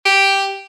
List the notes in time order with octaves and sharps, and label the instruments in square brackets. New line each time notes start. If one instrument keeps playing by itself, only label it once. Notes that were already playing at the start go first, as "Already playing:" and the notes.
[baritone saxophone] G4